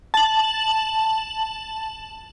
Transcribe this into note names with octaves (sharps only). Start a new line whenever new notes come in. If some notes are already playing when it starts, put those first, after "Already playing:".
A5 F#7